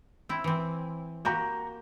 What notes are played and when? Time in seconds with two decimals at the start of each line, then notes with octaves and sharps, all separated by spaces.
0.29 C4 E4
0.44 E3 C4
1.25 A#3 F#4 G4 A#5 G6